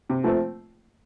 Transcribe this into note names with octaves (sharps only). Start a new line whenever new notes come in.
C3
F3 A3 C4